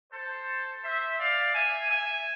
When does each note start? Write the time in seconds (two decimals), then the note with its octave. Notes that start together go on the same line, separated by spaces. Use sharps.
0.13 A4 C5
0.84 C5 E5
1.19 D5 F5
1.54 E5 G#5
1.90 E5 G#5